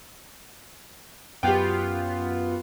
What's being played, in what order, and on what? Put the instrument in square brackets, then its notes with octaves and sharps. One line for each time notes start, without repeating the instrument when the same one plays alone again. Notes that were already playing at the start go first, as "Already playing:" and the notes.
[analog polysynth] F#2 B3 F4 [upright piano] G4 G5